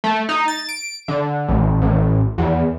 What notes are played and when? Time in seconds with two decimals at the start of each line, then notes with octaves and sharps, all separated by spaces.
0.04 A3
0.29 D#4
0.48 A6
0.69 D7
1.08 D3
1.48 A1
1.82 A1
2.38 E2